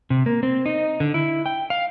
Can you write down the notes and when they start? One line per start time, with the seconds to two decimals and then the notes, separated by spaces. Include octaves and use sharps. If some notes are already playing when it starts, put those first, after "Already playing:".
0.10 C3
0.26 A#3
0.43 C4
0.66 D#4
1.00 D3
1.14 E4
1.46 G5
1.70 F5